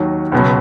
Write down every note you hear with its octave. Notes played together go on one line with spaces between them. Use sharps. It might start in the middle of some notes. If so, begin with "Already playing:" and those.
Already playing: D#2 D#3 F#3
C#2 B2 F#3